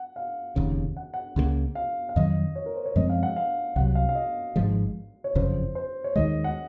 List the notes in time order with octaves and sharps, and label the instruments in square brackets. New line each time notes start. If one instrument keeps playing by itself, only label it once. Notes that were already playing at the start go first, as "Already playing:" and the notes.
Already playing: [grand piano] F#5
F5
[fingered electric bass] F1 D#2 C#3
[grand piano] F#5
F#5
[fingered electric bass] C#2 C#3 F#3 A#3
[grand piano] F5
F5
[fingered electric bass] F2 D#3 F#3 [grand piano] D#5
[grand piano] C#5
A#4
C5
C#5
[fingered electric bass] F#2 F3 G#3 C4 [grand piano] D#5
[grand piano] F5
F#5
F5
[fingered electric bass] C2 C3 F#3 [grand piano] F#5
[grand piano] F5
F5
D#5
[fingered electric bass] G#1 G#2 F3 G#3
[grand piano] C#5
[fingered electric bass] F#1 F2 C#3 F3 [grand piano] C5
[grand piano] C5
C#5
[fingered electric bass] D#2 D#3 G#3 [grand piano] D#5
[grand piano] F#5